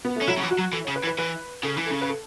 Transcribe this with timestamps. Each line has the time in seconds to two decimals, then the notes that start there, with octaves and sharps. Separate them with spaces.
0.05 B3
0.16 A3
0.22 C#4
0.28 F#3 E4
0.38 C#3
0.43 E3
0.51 F#4
0.58 F#3
0.73 E3 A4
0.84 C#5
0.88 C#3
0.96 B4
1.03 E3
1.07 B4
1.18 E3 B4
1.63 C#3 A4
1.77 E3
1.86 C#3 A4
2.01 B4
2.09 A4